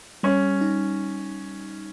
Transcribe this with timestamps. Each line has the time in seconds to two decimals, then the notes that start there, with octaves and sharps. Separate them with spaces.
0.23 G3 C#4
0.61 D#4